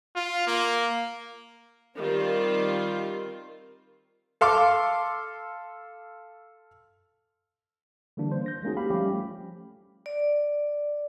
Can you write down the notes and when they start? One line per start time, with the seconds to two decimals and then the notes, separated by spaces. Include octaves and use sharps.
0.16 F4
0.47 A#3
1.97 D#3 G3 C4 F4
4.41 A4 F5 C6 D6
8.17 D3 E3 G3 A#3 D4
8.32 C5
8.46 G6 A#6
8.63 G#3 A#3 C#4 D#4 F#4 G#4
8.77 G4 F5 B5
8.90 F3 G3 A3 C#4 G4
10.06 D5